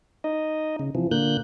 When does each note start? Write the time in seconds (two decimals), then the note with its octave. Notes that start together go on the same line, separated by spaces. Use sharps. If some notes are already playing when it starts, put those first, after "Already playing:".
0.24 D#4 D#5
0.79 C#3
0.95 C3 E3 F3
1.11 A#2 D3 A#3 F#6 G6